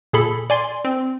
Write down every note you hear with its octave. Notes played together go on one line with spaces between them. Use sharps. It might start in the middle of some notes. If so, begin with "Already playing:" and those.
A#2 G#4 A4 B5
D5 G#5 C6
C4